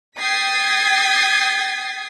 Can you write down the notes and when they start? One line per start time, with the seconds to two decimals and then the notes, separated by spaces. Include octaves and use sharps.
0.20 G5 D#6 G#6 A6 B6 C7